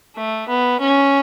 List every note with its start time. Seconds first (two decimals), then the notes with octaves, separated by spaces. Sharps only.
0.17 A3
0.49 B3
0.80 C#4